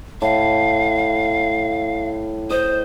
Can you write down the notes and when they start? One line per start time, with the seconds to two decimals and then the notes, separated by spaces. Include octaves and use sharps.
0.22 A2 F5
2.50 C5 D#5